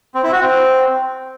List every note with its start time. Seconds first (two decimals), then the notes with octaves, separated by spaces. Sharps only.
0.15 C4
0.24 E4
0.32 F#4
0.41 C4